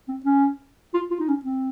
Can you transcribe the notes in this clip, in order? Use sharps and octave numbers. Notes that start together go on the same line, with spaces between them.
C4
C#4
F4
F4
D#4
C#4
C4